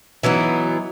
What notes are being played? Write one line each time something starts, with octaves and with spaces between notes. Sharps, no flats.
E3 F#3 B3 D#4